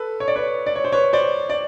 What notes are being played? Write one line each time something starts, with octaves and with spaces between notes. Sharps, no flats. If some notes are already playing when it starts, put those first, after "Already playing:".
Already playing: A4 B4
C#5
D5
B4 C#5
D5
C#5
C5
B4 C#5
C5 D5
D5